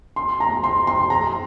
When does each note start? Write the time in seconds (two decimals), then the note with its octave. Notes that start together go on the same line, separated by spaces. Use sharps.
0.16 C6
0.40 A#5
0.64 C6
0.87 C6
1.10 A#5